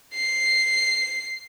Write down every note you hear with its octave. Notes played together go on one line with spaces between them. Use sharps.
C7